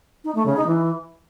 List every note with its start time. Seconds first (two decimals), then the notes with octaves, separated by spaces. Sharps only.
0.24 D#4
0.35 A3
0.46 C#3
0.56 D#4
0.67 E3